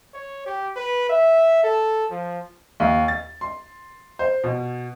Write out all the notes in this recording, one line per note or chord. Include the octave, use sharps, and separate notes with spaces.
C#5
G4
B4
E5
A4
F3
D#2
A6
C6
C5
B2